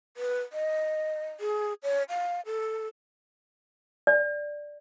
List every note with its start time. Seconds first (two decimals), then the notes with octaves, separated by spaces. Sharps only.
0.17 B4
0.53 D#5
1.40 G#4
1.83 C#5
2.09 F5
2.46 A4
4.07 D5